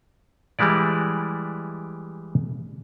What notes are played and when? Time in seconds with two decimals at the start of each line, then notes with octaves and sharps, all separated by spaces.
0.59 E3 G3 G#3 E4 D5